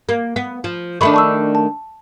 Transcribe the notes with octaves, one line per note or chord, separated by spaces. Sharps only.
A#3
B3
F3
D#3 A3 D4 B5 C#6
A5 C#6 E6
A5